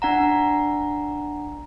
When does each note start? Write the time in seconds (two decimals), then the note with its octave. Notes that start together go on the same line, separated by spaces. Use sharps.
0.02 D4 F#5 A#5